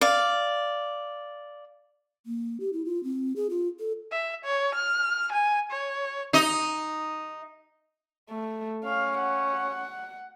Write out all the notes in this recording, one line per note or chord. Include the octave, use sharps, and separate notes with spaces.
D5 F5
A#3
G4
E4
F4
C4
G#4
F4
A4
E5
C#5
F6
G#5
C#5
D#4 D#5
A3
C#4 F5
F#5